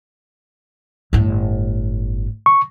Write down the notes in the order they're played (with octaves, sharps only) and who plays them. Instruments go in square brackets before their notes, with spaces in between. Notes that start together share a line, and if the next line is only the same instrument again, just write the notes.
[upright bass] G1 A2
[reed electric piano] C#6